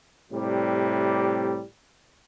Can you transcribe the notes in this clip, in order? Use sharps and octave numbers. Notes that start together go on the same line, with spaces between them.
A2 C3 G3